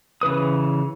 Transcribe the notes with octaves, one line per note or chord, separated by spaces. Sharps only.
C#3 E3 B4 D#6